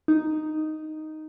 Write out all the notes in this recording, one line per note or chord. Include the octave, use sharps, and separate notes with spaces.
D#4